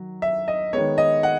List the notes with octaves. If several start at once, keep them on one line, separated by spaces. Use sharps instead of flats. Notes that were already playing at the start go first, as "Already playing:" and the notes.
Already playing: D#3 F#3
E5
D#5
D#3 G#3 B3 C#5
D#5
F#5